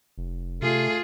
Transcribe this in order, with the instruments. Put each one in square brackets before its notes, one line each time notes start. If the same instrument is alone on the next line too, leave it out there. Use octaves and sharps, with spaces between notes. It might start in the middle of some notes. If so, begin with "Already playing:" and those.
[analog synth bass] F1
[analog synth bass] C3 [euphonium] A3 [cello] F4 G#4